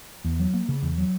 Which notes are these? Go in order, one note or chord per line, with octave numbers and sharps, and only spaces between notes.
E2
F#3
A#3
C#3
E2
F#3